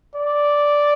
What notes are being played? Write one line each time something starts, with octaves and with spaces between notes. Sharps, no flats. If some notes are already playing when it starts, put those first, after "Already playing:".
D5